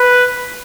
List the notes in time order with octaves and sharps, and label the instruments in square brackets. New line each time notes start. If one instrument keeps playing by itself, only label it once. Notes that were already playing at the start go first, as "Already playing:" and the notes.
Already playing: [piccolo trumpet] B4